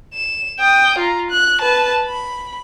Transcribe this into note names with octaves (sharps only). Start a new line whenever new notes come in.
E7
G5 D#6
F4 A#5
F#6
B4 A5
B5